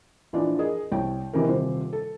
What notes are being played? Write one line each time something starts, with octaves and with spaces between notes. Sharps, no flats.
A#1 E3 F3 D4 D5
G#4 A#4 D#5
C2 C#5 G5
C3 D#3 E3 C4 G4 A#4
D#1 C3 C5
A4